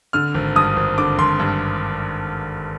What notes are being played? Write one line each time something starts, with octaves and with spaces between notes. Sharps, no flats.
D3 F6
G#1
G2 D#6
G#1
D3 D6
G#1 C6
G2